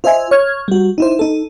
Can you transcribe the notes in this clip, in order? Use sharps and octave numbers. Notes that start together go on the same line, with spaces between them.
F4 C5 D#5 E5 G#5
C#5 F6 G#6
G3 F#4
D#4 E4 C5
D#4 A4